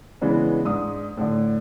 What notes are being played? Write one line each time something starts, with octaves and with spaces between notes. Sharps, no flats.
C#3 E3 G#3 B3 D4
G#2 D4 D#6
A2 D3